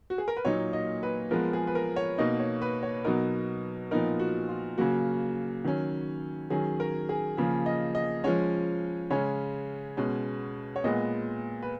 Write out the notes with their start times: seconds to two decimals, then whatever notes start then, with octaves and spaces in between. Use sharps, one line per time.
0.10 F#4
0.18 G#4
0.28 A#4
0.37 B4
0.45 A#2 F#3 A#3 D#4 C#5
0.73 D#5
1.03 B4
1.31 F3 G#3 B3 A#4
1.53 G#4
1.67 B4
1.75 A#4
1.96 C#5
2.18 B2 A#3 D#4 D#5
2.40 C#5
2.62 B4
2.83 C#5
3.05 B2 F#3 B3 D#4 A#4
3.91 A#2 F3 B3 D#4 A#4
4.19 F#4
4.49 F4
4.78 C#3 F#3 A#3 F#4
5.64 D#3 F#3 C#4
6.50 D#3 F#3 C#4 G#4
6.80 A#4
7.09 G#4
7.37 C#3 F3 A#3 G#4
7.66 D#5
7.95 D#5
8.24 F3 G#3 C#4 C#5
9.10 C#3 G#3 C#4 C#5
9.97 B2 G#3 C#4
10.76 C#5
10.84 A#2 G#3 B3 D#5
11.62 B4